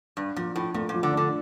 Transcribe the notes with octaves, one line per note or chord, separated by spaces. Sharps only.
G2 D4
A#2 F3
A2 F3
A#2 A3
A#2
F3
D3
D4
D3